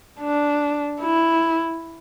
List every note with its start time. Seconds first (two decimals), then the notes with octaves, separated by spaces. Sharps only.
0.20 D4
1.01 E4